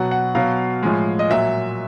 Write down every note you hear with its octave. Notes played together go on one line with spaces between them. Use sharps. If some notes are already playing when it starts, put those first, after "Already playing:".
Already playing: B2 F#3 F#5
F#5
B2 F#3 F5
A2 F3 G#3
D#5
A#2 F#3 E5